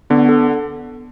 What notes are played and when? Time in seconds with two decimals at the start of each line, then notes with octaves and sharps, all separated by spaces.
0.10 D3 B3
0.29 A4